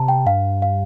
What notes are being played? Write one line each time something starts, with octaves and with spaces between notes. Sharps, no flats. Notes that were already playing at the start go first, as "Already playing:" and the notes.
Already playing: C3 A5 A#5
G5
G2 F5
F5